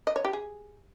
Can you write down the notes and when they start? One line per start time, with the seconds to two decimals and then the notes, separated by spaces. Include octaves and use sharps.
0.07 D#5
0.16 C#5
0.25 G4
0.33 G#4